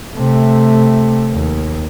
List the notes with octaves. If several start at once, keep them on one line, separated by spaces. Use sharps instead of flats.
C3 A3
D#2